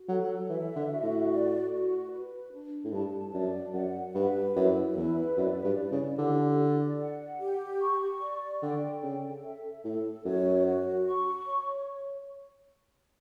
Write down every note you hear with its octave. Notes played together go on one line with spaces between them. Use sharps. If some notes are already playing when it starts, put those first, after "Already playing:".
Already playing: F#4
F#3 A4
F#3
E3 E5
D3
F#4
A2
D5
F#4
B4
D4
A2
G2 A5
F#2 D5
F#2 F#5
G2 B4
F#2 E4
E2 B4
F#2 D5
G2
E4
C#3
D3 G4
D5
F#5
G4
C#6
D5
D3 G5
C#3 A4
E5
A2 A4
F#2 C#5
F#4
C#6
C#5